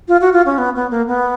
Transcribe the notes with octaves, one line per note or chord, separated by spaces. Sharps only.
F4
F#4
F4
C#4
B3
B3
A#3
B3